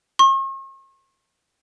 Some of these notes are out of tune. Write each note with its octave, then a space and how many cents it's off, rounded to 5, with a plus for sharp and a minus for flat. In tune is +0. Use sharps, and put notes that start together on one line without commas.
C#6 -45